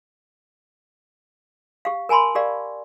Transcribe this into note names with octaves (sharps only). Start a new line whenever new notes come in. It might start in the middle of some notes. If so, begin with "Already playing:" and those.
G4 F5
A#4 G#5 A5 B5 C6
G4 A#4 D5 F5